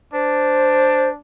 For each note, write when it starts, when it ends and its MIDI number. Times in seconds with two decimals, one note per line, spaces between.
0.13 1.18 62
0.13 1.09 72